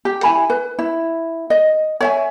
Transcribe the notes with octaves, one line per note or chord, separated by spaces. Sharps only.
G4
E4 G#5 B5
B4
E4
D#5
C#5 E5 G#5